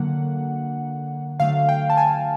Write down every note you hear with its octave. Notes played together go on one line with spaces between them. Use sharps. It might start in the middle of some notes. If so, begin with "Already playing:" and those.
Already playing: D3 F#3 A#3 F#5
D3 F#3 A3 F5
G5
A5
G#5